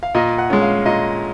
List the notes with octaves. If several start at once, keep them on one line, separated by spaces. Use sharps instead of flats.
F5
A#2 D#5
F#5
G#3 C#4
F5
A#2 D#5